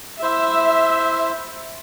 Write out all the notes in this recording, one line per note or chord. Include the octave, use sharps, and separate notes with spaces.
E4 C5 E5